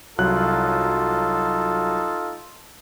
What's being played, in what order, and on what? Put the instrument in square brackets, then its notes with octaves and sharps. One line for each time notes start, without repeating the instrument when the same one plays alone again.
[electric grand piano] C2 F#3 F#6 [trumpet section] D#4 F4 A4